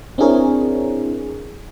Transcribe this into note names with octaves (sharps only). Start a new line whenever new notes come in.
C4 D4 E4 G#4 A#4 C#5